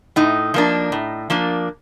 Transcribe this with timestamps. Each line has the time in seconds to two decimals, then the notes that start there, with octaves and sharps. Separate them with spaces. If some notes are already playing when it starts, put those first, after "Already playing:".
0.16 A2 D#4
0.54 F3 A#3 D4
0.92 A2
1.30 F3 A#3 D4